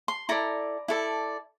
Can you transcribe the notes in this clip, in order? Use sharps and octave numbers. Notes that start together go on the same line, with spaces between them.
C6
E4 A4 D5 A#5
E4 A4 D5